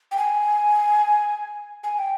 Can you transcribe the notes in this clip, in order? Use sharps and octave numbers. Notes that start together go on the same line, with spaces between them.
G5
G#5
G#5
G5